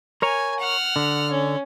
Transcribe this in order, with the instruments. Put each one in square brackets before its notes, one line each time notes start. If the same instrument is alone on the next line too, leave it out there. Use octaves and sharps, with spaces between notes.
[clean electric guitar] A#4 C#5 A#5 [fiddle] G#5
[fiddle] F#5 F6
[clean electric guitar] D3
[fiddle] C#4